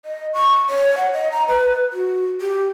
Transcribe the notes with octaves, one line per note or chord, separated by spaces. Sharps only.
D#5
C#6
C#5
F#5
D#5
A#5
B4
F#4
G4